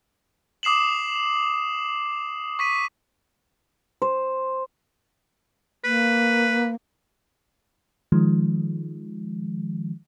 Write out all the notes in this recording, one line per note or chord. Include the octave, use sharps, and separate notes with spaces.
D6 D#6 C7 E7 F#7
C#6 B6 D#7
C5
A#3 B4
D#3 F3 G#3